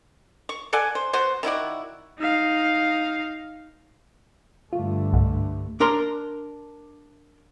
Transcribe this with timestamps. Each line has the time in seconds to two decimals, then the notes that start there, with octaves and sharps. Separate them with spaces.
0.49 C#6
0.73 A4 D5 F#5 G#5
0.95 C5
1.13 B3 F#4 C5
1.43 D#3 E4 F#4 D5
2.19 D#4 F5
4.73 G2 D3 A3 F4
5.13 C2 G#2
5.80 D4 A#4 A#5 C6